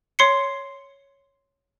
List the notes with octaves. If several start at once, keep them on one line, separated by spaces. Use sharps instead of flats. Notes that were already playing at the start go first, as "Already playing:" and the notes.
C#5 C6 C7 C#7